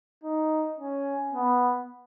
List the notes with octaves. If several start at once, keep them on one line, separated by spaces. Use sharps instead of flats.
D#4
C#4
B3